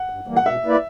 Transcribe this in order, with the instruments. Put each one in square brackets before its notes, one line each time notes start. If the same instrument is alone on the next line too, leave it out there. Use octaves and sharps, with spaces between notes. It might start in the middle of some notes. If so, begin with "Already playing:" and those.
Already playing: [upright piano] F#5
[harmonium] G2
E3 G3 A#3
[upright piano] F#5
[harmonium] B2 [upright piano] E5
[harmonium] A#3 E4 B4 D5